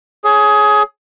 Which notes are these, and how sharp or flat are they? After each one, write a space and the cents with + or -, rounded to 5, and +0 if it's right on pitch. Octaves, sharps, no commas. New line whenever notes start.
G#4 +20 C#5 +0